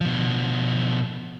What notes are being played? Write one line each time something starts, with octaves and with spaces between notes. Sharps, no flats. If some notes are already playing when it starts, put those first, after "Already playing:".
B2 F3